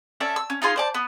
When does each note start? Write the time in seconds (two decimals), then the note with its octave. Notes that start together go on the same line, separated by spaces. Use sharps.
0.20 C#4 A4 D5 E5
0.36 E6
0.50 C#4
0.62 D#4 F4 G#4 C6
0.76 C5 D5 A5
0.94 B3